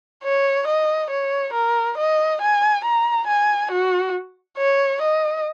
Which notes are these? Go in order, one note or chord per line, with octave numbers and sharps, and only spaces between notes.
C#5
D#5
C#5
A#4
D#5
G#5
A#5
G#5
F#4
C#5
D#5